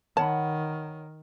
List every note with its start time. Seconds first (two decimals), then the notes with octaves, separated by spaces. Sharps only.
0.17 D#3 C#5 F#5 A5 B5